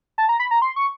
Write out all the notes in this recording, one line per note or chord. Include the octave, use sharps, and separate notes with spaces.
A5
A#5
B5
A#5
C6
C#6